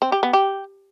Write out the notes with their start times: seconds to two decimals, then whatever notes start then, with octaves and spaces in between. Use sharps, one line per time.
0.02 C4
0.12 G4
0.23 B3
0.33 G4